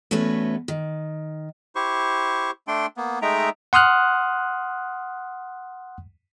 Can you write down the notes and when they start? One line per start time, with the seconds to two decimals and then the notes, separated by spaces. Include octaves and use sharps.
0.11 E2 A3 C#4 F#4 B4
0.68 D#3
1.76 E4 G4 C5 C#6
2.68 A3 D4 G5 C6
2.97 A#3 B3
3.22 G#3 A3 D#4 E5 G5 A#5
3.73 F#5 C6 D#6 F6 F#6